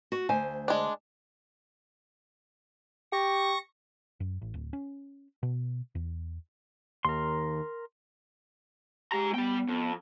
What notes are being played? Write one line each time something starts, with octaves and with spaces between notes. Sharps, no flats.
F#4
D2 C5 G#5
G#3 D4
G4 C#6 A#6
F#2
A1
D1
C#4
B2
E2
D#2 A#4 C6
G#3 G4 A#5
G3 B3 G5
F2